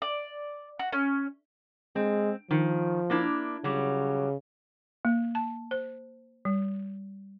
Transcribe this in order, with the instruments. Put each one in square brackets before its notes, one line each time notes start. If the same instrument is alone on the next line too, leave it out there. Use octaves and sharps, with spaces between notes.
[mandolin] D5
F#4
C#4
[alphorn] G#3 [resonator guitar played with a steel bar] C4
[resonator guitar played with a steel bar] D#3 [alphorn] F3
[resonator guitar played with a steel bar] A#3 D4 E4
[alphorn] C#3 [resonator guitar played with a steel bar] F#3 G3
[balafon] A#3
A5
C5
G3